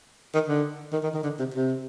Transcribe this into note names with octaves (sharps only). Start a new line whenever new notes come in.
D#3
D3
D#3
D#3
D#3
D3
C3
C3